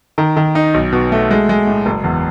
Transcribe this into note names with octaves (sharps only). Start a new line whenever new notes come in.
D#3
D#3
D#4
B1
B2
A3
G#3
G#3
A2
F#1
E2